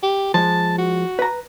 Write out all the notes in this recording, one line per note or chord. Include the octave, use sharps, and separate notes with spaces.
G4
F3 G#3 A5
F#4
B4 A#5